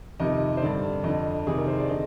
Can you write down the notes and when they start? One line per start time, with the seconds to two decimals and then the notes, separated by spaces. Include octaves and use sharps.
0.20 F2 C3 D#3 D#5
0.57 C5
0.62 G2 D3 D5
1.04 F2 D3 D#5
1.46 F2 C3 D#3 G#4
1.57 A#4
1.68 C5
1.78 D5
1.89 D3 D#5